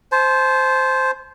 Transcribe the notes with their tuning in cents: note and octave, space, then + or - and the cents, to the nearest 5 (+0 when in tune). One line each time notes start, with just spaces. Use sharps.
C5 +0 A5 -40